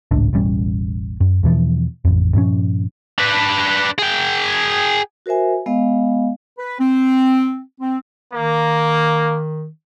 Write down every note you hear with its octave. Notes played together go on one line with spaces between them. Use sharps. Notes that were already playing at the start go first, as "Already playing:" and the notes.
G#1 C#2 A2 D4
E1 A1 G3 C#4
F#2
E2 B2 E3 F3
A1 F2
G2 A#2 F3 C#4
D4 B4
G#4 G5
F#4 A#4 C5 E5 G#5
G#3 B3 D#5 F5
B4
C4
C4
D#3 A#3